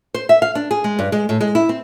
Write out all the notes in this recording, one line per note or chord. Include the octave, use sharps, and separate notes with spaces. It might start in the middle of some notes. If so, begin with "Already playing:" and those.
C5
E5
F5
D4
G#4
G#3
G2
G#3
A2
G#3
E4
C4